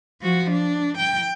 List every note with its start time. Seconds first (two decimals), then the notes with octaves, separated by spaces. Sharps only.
0.21 F3 F#4
0.51 D4
0.98 G5